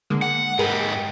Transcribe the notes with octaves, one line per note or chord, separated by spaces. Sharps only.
D3 G#3 A#3
F#5
G#2 G4 G#4 A#4 B4